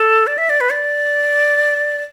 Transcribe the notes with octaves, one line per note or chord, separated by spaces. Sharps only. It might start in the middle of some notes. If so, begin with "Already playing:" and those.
Already playing: A4
D5
E5
D5
B4
D5